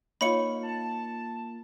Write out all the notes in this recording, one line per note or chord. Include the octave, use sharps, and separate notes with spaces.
A#3 D#4 F4 C#5 F5 B5 C#7
A5